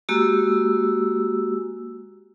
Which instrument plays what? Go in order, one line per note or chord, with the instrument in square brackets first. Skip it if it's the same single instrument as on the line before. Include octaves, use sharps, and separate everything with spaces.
[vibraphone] G#3 A#3 F#4 G4 E6